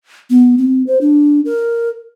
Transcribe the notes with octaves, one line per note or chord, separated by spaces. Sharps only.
B3
C4
C5
D4
A#4